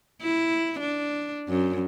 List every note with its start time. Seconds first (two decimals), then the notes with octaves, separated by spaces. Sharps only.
0.22 E4
0.80 D4
1.48 F#2